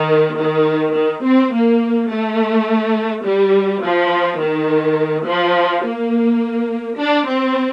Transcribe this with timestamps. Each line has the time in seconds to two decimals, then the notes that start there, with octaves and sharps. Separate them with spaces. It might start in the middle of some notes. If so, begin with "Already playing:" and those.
Already playing: D#3
0.37 D#3
0.94 D#3
1.24 C4
1.52 A#3
2.10 A3
3.25 G3
3.82 F3
4.40 D#3
5.26 F3
5.84 A#3
6.99 D4
7.28 C4